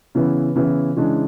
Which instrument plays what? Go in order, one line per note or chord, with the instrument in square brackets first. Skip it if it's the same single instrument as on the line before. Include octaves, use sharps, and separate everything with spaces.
[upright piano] C#3 E3 B3 E4
C#3 E3 B3 E4
C#3 E3 G#3 D4